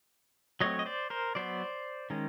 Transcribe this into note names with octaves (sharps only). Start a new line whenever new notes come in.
F#3 A3 C4 C#5 D#5
D#5
C5 D5
A#4 C5
F#3 B3 C5 D5
D#3 G#3 C#4